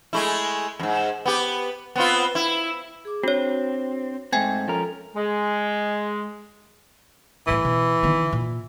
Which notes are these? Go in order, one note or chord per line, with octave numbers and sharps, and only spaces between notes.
G#3 A3 E4
F2 G#2
B3 G4
B3 C4 F4
E4
G#4 D6
C4 D4 F#4 C#5
G#2 A3 C4 G5 G#5 G#6
F3 C#4 A4 A#4
G#3
A2 E3 A3
B2
D#3 B3
A#2